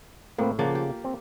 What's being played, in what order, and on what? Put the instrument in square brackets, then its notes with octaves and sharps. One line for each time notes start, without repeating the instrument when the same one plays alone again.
[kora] A2 [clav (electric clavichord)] A#3 C4 B4
[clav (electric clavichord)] C#3 F#5 [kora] F3 A#3 D5
[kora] G4
[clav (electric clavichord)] C4